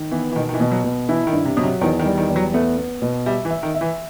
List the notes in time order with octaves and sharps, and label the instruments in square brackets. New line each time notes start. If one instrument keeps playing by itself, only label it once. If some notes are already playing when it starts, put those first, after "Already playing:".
Already playing: [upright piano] D#3
[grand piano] E3 [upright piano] B3
[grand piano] E3
[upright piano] B2 [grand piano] D#3
[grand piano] D#3
E3
[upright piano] B2
[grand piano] F#3
[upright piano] B2
[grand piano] E3 [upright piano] E4
[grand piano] D#3
[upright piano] G2
[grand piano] C3
[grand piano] B2 [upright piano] F#3
[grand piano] C3
[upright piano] E2 [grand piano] D#3
[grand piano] D#3
[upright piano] G3
[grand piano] D#3
[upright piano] E2
[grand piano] F#3
[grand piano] A3 [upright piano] B3
[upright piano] B3
B2
[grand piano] G3 [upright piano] E5
[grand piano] E3
[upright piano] E5
[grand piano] D#3
[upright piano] E5
[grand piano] E3